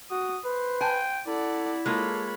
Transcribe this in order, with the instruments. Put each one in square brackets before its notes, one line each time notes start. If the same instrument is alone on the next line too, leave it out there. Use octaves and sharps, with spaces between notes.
[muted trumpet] F#4 [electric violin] D#6
[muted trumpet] B4 [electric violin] C5
[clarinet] G5 [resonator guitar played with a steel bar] G#5
[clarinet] E4 [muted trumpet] A4 [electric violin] D5 F#5
[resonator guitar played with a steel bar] G#3 A#3 F4 [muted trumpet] A4 [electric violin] C#5 B5